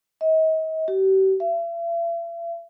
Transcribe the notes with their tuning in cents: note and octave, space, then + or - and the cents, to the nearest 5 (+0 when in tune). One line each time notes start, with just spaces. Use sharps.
D#5 +40
G4 -40
E5 +45